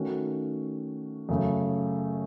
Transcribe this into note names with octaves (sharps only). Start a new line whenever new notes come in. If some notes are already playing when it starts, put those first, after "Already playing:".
Already playing: D#3 A3 C#4 F#4
F#2 C#3 A3